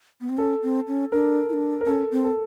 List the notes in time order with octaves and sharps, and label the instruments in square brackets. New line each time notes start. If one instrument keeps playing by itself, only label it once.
[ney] B3
C4
[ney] C#4 [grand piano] A4
[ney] C4
C#4
[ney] D4 [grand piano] A#4
[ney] E4
D4
[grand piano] A#4
[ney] C#4 [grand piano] A4
[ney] C4
[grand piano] A4